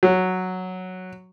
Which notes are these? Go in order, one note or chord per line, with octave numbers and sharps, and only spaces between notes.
F#3